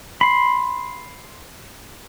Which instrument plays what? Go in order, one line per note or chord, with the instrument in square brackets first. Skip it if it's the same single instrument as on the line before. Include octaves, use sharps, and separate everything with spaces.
[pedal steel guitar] B5 C6